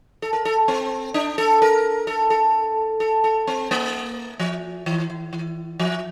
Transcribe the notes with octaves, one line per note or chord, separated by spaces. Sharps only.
A4
A#4
A4
C4
D4
A4
A#4
A4
A4
A4
A4
C4
A#3
F3
E3
E3
E3
F3